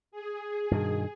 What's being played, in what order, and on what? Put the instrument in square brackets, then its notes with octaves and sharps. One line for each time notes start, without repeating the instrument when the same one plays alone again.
[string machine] G#4
[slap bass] G2 B2 D#3